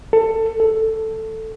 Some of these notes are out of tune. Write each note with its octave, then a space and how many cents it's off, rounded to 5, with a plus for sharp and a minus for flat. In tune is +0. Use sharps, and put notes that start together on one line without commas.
A4 +20
A4 +5